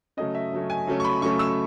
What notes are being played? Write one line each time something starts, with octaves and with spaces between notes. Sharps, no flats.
C#3 F#3 A3 C#4 D#5
E5
C#3 F#3 A3 C#4
G#5
C#3 F#3 A3 C#4
C#6
B5
C#3 F#3 A3 C#4 C#6
E6